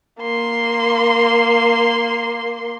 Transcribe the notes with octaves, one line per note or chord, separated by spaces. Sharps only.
A#3 C6